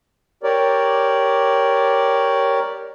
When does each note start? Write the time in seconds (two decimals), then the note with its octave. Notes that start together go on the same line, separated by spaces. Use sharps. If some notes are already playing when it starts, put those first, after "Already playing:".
0.43 G4 A#4 C#5 D5